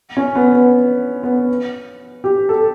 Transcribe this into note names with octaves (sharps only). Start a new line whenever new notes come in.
C#4
B3
B3
B3
G4
A4